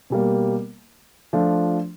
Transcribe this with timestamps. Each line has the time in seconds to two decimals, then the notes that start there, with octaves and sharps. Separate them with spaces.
0.10 B2 G3 A#3
1.33 F3 A3 D4 F4